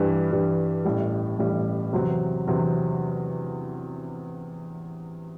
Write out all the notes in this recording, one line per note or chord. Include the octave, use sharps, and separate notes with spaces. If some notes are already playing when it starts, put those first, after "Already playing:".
Already playing: G2 E3 G3
G2 E3 G3
A1 A2 G3
A1 A2 G3
E2 C3 F#3 C4
E2 C3 F#3 C4